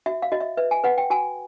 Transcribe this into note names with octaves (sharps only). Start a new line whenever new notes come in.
F#4 E5
F5
F#4 D#5
E5
B4 E5
G#5
B4 F#5
G5
F#4 G#5